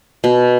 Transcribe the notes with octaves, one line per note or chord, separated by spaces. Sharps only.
B2